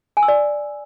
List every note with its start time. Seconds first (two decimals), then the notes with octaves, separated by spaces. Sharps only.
0.17 G#5
0.23 E6
0.28 D5